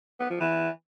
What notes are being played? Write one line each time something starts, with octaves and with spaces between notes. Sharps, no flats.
B3
F3
E3